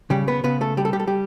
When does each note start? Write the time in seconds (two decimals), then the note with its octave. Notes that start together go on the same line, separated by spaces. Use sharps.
0.10 C#3 G3 G4
0.28 B3 B4
0.44 C#3 B3 B4
0.61 A3 A4
0.77 G3 G4
0.85 A4
0.93 G4
1.00 A4
1.07 G3 G4